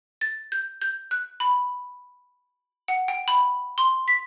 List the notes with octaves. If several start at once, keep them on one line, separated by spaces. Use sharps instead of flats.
A6
G6
G6
F#6
B5
F#5
G5
B5
C6
B6